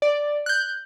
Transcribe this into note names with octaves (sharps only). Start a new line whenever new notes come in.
D5
F#6 G6